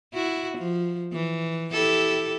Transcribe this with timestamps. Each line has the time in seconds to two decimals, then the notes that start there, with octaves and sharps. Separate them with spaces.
0.14 E4 F#4
0.58 F3
1.12 E3
1.73 E4 G4 A4